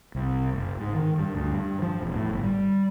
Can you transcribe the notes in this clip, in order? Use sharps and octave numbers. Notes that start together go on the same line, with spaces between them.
C2
F#1
G#2
D#3
G2
D2
G2
F3
E1
A2
G1
G3